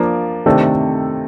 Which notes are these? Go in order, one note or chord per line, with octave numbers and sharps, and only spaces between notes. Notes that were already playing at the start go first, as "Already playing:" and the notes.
Already playing: F3 A#3 D4
C3 D#3 A3 D4 A4